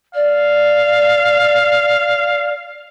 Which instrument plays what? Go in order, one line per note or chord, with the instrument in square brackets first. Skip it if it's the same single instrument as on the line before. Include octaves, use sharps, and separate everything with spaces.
[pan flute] D5 [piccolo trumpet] F5